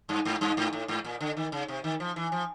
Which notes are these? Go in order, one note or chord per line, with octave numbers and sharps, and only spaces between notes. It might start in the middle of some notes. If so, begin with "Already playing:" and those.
G2
G#2
G2
G#2
A2
G#2
A#2
D3
D#3
C#3
C3
D#3
F3
E3
F3